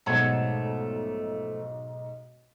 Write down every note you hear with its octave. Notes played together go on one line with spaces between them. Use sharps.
B1 G#2 F3 A3 C#5 F#5 A5